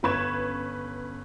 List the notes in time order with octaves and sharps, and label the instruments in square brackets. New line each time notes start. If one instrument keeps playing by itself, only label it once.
[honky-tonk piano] G1 C#4 B4 C#6 G#6 E7